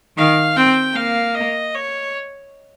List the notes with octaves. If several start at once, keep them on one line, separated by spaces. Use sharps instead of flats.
D#3 F5
C4 G5
A#3 F5
D#5
C#5